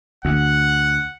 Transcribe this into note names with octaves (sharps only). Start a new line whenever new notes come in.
D2 F#5